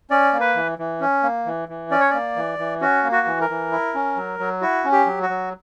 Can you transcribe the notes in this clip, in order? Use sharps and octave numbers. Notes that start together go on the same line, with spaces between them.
C#4 D5
A#3
B4
E3
E3
C#4
A#3
E3
E3
C#4 D5
C#5
A#3 D5
E3
E3
C#4 F#4
A#3
F#4
E3
A#4
E3
E4
C#4
F#3
F#3
E4 F#4
C#4
G4
F#3
F#4
F#3